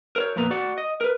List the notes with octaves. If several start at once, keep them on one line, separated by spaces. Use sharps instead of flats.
A#4 C5 C#5
F2 A#2 B3 A#5
F#4 D5 F#5
D#5
A#4 B4